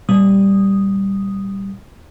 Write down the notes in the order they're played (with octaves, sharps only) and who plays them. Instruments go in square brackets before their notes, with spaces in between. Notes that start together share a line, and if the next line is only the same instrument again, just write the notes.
[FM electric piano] A#2 G3 D#6